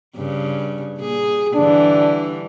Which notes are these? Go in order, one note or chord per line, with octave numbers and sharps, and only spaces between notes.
G2 C#3
A#2 G#4
G2 D3 E3 D4